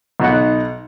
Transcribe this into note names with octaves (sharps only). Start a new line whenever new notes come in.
B1 B2 D#4 F#5